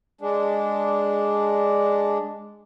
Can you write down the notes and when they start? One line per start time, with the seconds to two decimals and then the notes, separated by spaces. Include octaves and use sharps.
0.21 G#3 D4